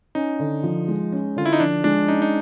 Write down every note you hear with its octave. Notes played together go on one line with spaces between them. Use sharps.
C#4 D#4
D3
F3
G#3
C#4
D3 F4
E4
D#4
F3 D4
G#3 D4
C#4 D#4
D#4